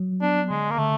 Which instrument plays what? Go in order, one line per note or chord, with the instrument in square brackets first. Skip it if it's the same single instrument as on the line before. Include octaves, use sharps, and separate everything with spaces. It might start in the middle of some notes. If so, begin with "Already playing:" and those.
Already playing: [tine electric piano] F#3
[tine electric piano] B3 [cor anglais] D4
[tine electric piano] D3 [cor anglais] G#3
[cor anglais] A#3
[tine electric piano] D3 [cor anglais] A3